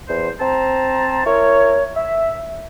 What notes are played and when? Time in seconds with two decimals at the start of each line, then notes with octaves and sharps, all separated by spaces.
0.08 E2 C5
0.40 C4 C5 A5 A#5
1.26 E4 A#4 C#5
1.96 E5